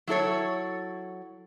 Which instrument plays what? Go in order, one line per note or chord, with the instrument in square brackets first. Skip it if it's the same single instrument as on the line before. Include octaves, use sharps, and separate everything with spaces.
[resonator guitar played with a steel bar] F#3 E4 A4 C#5